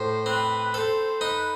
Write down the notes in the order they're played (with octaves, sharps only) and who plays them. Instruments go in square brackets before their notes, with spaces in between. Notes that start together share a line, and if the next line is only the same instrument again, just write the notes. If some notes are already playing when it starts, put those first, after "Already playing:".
Already playing: [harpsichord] A2 [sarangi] C5
[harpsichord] C4 [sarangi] B4
[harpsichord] A4 [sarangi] C5
[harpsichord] D#4 [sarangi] B4